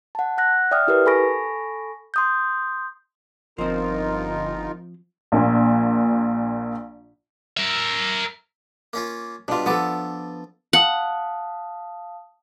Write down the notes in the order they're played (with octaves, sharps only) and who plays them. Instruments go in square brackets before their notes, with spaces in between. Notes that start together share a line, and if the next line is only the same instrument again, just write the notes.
[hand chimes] F#5 A5
F#5 F#6 A#6
D5 E5 G5 D#6 F6
E4 G4 A#4 B4
A4 G#5 B5 C#6 A#6 D7
C6 D#6 G6
[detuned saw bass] G1 [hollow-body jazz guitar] F3 C4 [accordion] D#4 F4 A#4
[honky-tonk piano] A#1 A#2
[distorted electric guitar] A#4 E5
[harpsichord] A#3 C#4 F4
[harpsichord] B2 G3 [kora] D4 F4
[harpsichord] F3 A5 D6 [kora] B3 A4
[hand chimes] F5 A5 D#6 [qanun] F#5